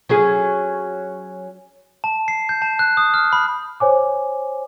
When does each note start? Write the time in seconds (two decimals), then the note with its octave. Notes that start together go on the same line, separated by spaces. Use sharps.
0.09 F#3 C#4 G#4
2.04 A5
2.28 C7
2.49 G6
2.62 A5
2.79 F#6
2.97 D#6
3.14 F6
3.33 B5
3.80 C5 C#5 G#5 D6